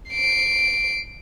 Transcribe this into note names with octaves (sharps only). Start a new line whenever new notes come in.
C7 D7